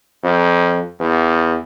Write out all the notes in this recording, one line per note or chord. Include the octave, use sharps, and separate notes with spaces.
F2
E2